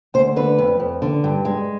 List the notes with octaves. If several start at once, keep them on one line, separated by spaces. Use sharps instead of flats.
D2 C5
D3 B4
F2
F2
D3
G2
G#3